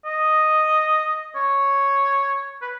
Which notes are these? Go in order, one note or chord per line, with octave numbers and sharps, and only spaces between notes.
D#5
C#5
B4